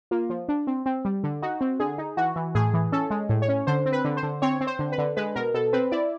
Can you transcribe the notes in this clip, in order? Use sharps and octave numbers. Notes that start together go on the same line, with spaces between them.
A#3 F4
F3
D4
C4
C4
G3
D3
D#4 F#4
C4
D3 G#4
D#4
E3 F#4
E3
A2 G#4
E3
C#4 A4
G#3
A2
C#5
C#4
D3 C5
C4
B4
D3
C5
D3
C4 C#5
C4
C5
D3
B4
D3
G#3 B4
B2 A#4
B2 A4
C4 B4
E4 D5